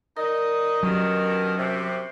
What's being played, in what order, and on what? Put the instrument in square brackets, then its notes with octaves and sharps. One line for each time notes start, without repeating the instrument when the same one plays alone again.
[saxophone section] D#4 D#5 [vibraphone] A#4 D5
[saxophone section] B2 D3 D#3 [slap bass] F#3 [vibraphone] C#4 G4
[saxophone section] F#2 C3